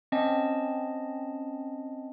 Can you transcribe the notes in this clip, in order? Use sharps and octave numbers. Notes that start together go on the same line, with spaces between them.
C4 C#4 D#5 A5